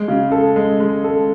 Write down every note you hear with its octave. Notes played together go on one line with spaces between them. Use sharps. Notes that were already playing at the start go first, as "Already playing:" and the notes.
Already playing: G#3
C#3
A4
G#3
G#3
A4